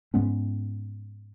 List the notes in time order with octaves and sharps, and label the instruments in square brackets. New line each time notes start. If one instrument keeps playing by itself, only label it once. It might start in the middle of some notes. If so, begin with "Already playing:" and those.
[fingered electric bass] G#2 G#3 B3 C#4